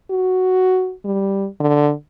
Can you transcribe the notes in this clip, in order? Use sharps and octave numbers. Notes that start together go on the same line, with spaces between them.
F#4
G3
D3